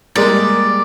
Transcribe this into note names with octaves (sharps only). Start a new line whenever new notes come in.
G3 G#3 A#3 D5